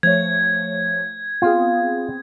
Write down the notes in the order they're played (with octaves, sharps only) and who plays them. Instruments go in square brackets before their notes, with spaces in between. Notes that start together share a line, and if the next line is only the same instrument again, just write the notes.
[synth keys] F3 A3 C#5 [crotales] G#6
[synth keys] B3 C4 G#4 [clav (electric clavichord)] F4